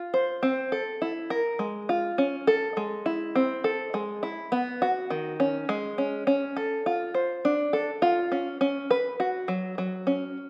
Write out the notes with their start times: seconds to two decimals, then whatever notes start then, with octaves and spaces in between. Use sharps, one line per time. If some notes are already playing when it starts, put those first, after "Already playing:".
Already playing: F4
0.14 C5
0.43 C4
0.72 A4
1.02 E4
1.30 A#4
1.59 G#3
1.89 F4
2.18 C#4
2.47 A4
2.77 G#3
3.06 E4
3.36 C4
3.64 A4
3.94 G#3
4.23 E4
4.52 B3
4.82 F#4
5.10 D#3
5.40 C#4
5.69 G#3
5.98 C#4
6.27 C#4
6.57 A4
6.86 F4
7.14 C5
7.45 D4
7.73 A4
8.02 F4
8.32 C#4
8.61 C#4
8.91 B4
9.20 F#4
9.48 F#3
9.78 F#3
10.07 C#4